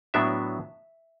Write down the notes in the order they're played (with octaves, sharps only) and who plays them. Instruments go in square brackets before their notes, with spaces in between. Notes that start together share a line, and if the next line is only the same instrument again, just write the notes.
[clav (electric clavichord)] A2 F#3 B3 D4 E5